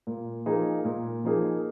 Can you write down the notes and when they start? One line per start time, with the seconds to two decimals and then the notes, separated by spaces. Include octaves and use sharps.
0.07 A#2
0.46 F3 A#3 D#4 G#4
0.85 A#2
1.24 F3 A#3 D#4 G#4